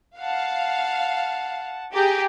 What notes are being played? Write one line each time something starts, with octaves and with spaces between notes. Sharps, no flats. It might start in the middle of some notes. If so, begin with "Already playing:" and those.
F5 F#5 A5
G4 G#4 A#5